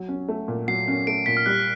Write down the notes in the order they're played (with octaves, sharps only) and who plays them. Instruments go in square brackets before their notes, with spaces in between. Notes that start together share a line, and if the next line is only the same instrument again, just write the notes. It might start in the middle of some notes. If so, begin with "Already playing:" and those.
Already playing: [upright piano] F#3
C#4
A3
A#2
[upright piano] F#3 [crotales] C7
[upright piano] C#4
[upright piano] A3 [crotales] D7
[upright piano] A#2 [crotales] B6
[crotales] F6
[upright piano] G3 [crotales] F#6